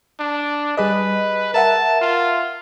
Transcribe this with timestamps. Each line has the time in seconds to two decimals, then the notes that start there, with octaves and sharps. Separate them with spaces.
0.20 D4
0.77 G3 G#4 B4 D#5
1.54 A#4 E5 F#5 A5
2.01 F4